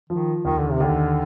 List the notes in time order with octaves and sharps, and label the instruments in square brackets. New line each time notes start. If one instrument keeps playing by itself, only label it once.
[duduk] D#3 [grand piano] F3
[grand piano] D#2 [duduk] D#3
[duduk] D3
C3
[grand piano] D#2 [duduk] D3